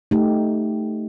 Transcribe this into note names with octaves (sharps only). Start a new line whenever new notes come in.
A3 D#4 G4